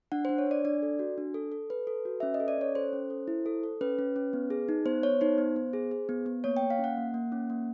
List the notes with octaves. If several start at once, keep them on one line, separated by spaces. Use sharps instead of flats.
D4 F#5
D4 C5
C#5
D4 D5
D4 D5
A4
F#4
D4
A4
A4
A4 B4
A4
F#4
C#4 E5
D#5
A4
D5
C#4 C#5
A4 C5
C#4
A4
E4
A4
A4
C#4 B4
C#4
C#4
B3
G#4
D#4
B3 C5
B3 C#5
D#4 C5
B3
B3
G#4
G#4
B3
B3
A#3 C#5
G5
A#3
F5
C#4 F#5
A#3
A#3
C#4
A#3